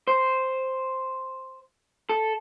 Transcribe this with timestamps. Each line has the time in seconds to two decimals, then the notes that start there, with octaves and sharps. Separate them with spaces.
0.08 C5
2.09 A4